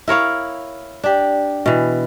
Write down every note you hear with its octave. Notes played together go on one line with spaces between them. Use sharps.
E4 A#4 C#5 F5
D4 G4
B2 E3